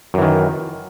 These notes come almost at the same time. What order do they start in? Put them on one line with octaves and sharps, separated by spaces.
F#2 E3 D#3